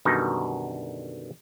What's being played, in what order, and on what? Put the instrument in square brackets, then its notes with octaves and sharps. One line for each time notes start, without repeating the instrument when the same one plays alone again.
[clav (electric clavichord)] F#2 B2 D3 D#3 G3 D#4